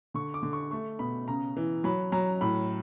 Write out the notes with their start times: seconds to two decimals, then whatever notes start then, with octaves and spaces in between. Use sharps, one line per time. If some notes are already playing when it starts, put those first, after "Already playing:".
0.14 D3 C#6
0.34 D6
0.43 D3
0.53 C#6
0.71 A3 C#6
0.99 B2 B5
1.28 C#3 A#5
1.57 E3
1.84 F#3 B5
2.12 F#3 A#5
2.41 A2 B5